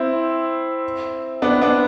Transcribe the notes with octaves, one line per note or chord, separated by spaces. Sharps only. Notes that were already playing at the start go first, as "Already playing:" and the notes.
Already playing: C4 E4
B3 D4
B3 D4